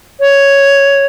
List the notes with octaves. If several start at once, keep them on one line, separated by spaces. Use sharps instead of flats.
C#5